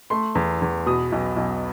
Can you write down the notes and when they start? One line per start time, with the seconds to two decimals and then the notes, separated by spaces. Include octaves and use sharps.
0.10 A3 C6
0.35 E2
0.62 E2
0.86 B2 D#6
1.12 B1
1.36 B1